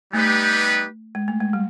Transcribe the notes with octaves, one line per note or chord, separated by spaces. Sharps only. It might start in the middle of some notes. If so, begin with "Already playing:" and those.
G3 A3 B3 D#4 G4 B4
G#3
A3
G#3
G3